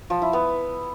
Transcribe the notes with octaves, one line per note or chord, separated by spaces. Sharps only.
F3
E4
B3